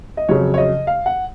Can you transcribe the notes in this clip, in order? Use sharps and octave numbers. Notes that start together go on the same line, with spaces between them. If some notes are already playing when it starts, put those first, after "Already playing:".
D#5
F2 C#3 F#3 C#5
C#5
D#5
F5
F#5